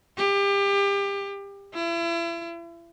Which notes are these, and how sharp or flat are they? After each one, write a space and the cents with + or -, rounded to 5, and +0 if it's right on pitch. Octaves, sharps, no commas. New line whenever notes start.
G4 +30
E4 +40